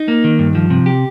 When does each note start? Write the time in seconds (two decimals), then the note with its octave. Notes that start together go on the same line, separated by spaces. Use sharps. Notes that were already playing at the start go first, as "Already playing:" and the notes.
Already playing: D#4
0.08 A#3
0.24 D#3
0.39 G2
0.55 F3
0.70 C3
0.86 G4